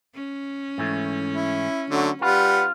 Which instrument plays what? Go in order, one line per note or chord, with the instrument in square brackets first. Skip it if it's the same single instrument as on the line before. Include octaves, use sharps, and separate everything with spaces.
[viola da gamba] C#4
[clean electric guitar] G#2 E3 A3
[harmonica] E4
D3 F#3 A3
[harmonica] G3 B4 F#5 [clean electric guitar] F4